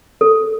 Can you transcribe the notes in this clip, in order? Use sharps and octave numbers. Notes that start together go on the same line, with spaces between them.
A4